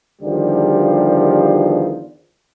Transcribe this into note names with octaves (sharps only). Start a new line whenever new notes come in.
E2 D3 D#3 F3 G3 G4